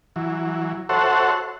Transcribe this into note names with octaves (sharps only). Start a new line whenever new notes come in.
E3 F#3
F#4 A4 C5 C#5 E5 F#5